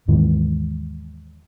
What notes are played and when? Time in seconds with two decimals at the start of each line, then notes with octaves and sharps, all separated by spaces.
0.08 D#2 G#2 D#3 E3